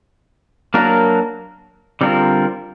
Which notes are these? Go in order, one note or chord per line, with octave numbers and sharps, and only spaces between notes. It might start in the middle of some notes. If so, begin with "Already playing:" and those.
F#3 A#3 D4 F#4 A#4
D3 G3 C4 F4 A#4